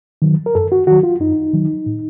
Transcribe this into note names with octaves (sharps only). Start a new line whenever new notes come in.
D#3 F#3
A#4
F#2 A4
F#4
D#3 F#3 F#4
F4
F#2 D#4
D#3 F#3
A2